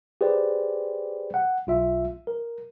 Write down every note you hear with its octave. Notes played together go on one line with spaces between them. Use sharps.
G4 G#4 B4 C5 D5
F#5
B1 F4 E5
A#4